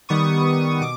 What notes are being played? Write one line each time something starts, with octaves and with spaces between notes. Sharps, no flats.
D#3 G3 B3 C#6 D#6
B2 D6